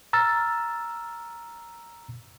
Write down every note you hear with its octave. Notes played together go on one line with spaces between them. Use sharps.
A#5 E6 F6 A6